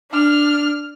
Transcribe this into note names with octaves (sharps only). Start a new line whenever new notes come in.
D4 F6